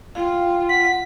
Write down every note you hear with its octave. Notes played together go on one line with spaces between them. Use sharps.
F4 F5 G5
F#5 B6